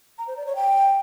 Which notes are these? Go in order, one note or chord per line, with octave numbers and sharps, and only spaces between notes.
A#5
C5
D5
C#5
G5